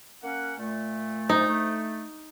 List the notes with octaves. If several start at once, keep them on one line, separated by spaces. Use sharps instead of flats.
A#3 C#4 F#5
A#2 A3
D#4
A3